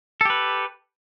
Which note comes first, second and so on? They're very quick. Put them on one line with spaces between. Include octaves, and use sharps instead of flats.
A4 G4 B4